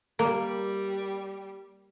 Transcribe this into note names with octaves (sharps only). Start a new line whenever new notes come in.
G3 A#3